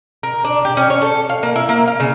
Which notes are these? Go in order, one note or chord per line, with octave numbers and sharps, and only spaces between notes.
A#4
D4
G4
C#4
C#5
A4
F5
A#3
E4
A#3
F5
C#3